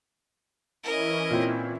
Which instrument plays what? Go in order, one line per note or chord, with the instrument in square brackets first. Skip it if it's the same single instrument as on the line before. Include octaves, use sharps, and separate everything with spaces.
[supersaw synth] E3 C#4 E4 [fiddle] A#4 D#5
[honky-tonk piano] A#2 C4